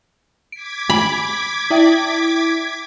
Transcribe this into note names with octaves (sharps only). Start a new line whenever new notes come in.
D6 G#6 B6 D7
B5
E4 E5 G5